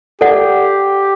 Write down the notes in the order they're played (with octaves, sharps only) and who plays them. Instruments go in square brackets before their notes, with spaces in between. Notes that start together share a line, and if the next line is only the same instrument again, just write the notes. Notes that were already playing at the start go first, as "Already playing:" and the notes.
[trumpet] G4 [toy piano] A4 D5 F#5